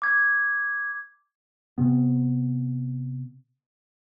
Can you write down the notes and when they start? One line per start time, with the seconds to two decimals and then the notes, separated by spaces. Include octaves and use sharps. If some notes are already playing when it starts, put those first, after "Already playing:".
0.02 D6 G#6
1.78 C3 B3